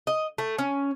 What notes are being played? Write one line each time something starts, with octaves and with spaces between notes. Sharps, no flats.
D#5
A3
C#4